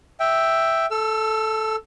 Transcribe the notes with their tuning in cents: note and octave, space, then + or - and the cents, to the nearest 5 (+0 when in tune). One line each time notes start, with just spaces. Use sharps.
E5 +0 G5 +0
A4 -5 E6 +35